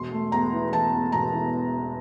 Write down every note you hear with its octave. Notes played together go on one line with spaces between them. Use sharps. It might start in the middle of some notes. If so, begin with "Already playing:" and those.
Already playing: E1 C6
A3
E2 A#5
E3
E3 A5
E2
E1 A#5
E3